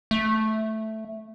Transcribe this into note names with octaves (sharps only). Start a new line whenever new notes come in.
A3